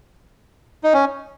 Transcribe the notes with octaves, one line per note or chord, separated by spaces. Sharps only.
D#4
C#4